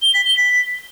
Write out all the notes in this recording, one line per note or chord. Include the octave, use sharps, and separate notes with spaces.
G7
B6
G7
B6